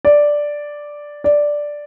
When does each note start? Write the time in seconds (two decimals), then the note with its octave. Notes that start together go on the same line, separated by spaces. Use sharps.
0.05 D5
1.24 D5